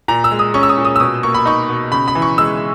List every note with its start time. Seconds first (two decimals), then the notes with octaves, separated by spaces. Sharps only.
0.08 A#2 A#5
0.24 E6
0.31 G#3
0.39 D#6
0.54 C#4 C#6
0.63 E6
0.69 D#6
0.78 A#2
0.85 D#6
0.96 E6
1.00 B2 D#6
1.23 A#3 C#6
1.34 B5
1.46 D#4 C#6
1.69 B2
1.92 C#3 B5
2.08 B5
2.15 E3
2.22 C#6
2.38 G#3 E6